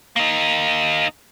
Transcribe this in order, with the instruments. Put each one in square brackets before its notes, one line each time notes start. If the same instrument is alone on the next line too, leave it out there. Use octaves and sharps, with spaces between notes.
[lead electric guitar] A#3 D#4